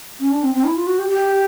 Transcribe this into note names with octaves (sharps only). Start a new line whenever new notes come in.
C#4
D4
C4
C4
E4
F4
F#4
G4
G4